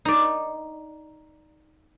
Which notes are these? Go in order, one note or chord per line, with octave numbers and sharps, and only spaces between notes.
D#4 D5